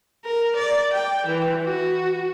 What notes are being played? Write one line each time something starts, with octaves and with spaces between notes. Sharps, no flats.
A#4
D5
G5
E3
F#4